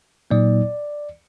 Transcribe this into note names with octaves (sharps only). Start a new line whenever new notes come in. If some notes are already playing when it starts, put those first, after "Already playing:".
A#2 F#3 A#3 D#4 D5